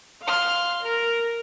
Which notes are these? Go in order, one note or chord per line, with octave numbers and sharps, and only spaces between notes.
F5 C6 F6
A#4